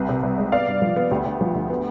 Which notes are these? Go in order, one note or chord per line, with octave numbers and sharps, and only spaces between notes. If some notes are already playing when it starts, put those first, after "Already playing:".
Already playing: C2 G4 B4
C3
C2
G#3
B3 D5 F5
G2
F3
B3
D2 G4
D2
F3
D2
B3